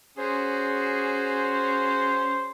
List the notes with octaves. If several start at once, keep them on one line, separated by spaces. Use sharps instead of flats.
C#4 F#4 G#4 C5